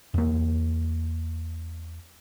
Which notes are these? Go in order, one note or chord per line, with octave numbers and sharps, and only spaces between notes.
E2 A#3